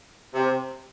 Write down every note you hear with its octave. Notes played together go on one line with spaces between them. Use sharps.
C3